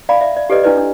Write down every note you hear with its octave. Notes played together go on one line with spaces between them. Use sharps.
D5 F5 A#5 B5
D5 E5
D5
G4 A4 B4 D5 D#5
D4 E4 B4 D5
D4